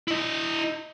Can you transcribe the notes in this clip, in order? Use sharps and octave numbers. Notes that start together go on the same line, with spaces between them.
E4 D#5